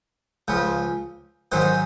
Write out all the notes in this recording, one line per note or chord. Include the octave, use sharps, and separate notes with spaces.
C#2 C#3 F3
G#2 D#3 F#3 C5